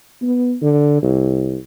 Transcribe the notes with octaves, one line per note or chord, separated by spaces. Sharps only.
B3
D3
C2